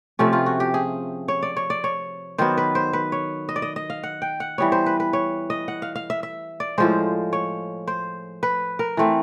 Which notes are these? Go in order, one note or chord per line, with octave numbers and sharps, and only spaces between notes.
C3 F3 A3 C4 C#4
F4
F#4
G4
G#4
C#5
D5
C#5
D5
C#5
D#3 F#3 B3 C5
B4
C5
B4
C#5
D#5
D5
D#5
D#5
F5
F#5
G5
F#5
E3 G3 B3 C#5
C5
B4
B4
C#5
D#5
F#5
F5
F5
E5
E5
D5
A2 F3 G#3 C5
C#5
C5
B4
A#4
E3 A3 C4